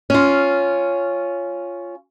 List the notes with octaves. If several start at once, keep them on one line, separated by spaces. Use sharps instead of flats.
C#4 F4